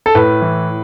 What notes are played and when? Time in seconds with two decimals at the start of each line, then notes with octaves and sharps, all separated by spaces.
0.06 A4
0.15 A2 B4
0.42 E3